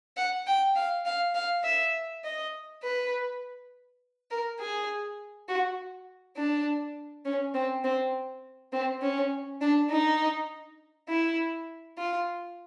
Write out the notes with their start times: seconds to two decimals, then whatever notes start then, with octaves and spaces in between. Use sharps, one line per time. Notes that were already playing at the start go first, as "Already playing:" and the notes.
0.17 F#5
0.47 G5
0.76 F5
1.06 F5
1.35 F5
1.64 E5
2.24 D#5
2.83 B4
4.31 A#4
4.59 G#4
5.48 F#4
6.37 D4
7.25 C#4
7.54 C4
7.84 C4
8.72 C4
9.02 C#4
9.61 D4
9.90 D#4
11.09 E4
11.98 F4